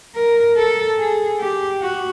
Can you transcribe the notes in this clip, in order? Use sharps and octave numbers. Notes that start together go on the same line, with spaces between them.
A#4
A4
G#4
G4
F#4